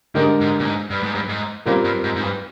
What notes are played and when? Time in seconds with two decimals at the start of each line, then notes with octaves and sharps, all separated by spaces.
0.15 G#2 D3 G#3 D4 G4 A#4
0.40 G#2
0.60 A#2
0.65 G#2
0.90 G2
1.03 G#2
1.15 G2
1.29 G#2
1.65 A#2 G3 C4 F4 A#4
1.84 G2
2.04 G#2
2.16 G#2
2.23 G2